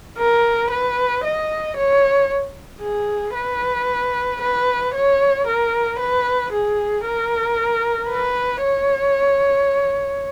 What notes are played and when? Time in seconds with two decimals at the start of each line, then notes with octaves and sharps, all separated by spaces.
0.18 A#4
0.71 B4
1.24 D#5
1.77 C#5
2.82 G#4
3.35 B4
4.42 B4
4.94 C#5
5.47 A#4
5.99 B4
6.53 G#4
7.06 A#4
8.10 B4
8.63 C#5